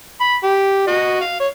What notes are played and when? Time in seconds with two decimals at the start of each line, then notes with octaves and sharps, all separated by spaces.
0.20 B5
0.43 G4
0.87 F#4 D#5
1.21 F5
1.40 C#5